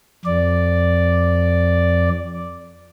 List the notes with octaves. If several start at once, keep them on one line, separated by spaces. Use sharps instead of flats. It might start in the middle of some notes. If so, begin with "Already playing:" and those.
F2 D5